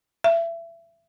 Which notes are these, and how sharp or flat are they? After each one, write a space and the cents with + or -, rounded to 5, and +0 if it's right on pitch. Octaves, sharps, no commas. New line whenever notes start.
E5 +25